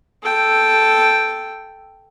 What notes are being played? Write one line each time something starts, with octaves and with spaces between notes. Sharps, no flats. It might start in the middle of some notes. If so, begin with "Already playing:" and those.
A4 G5